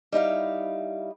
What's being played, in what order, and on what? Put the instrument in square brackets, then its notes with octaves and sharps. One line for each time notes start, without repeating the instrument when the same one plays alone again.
[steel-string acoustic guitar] G3 D#4 E4 F5